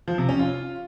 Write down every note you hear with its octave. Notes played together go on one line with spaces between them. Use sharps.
F3
C3
C#4
F4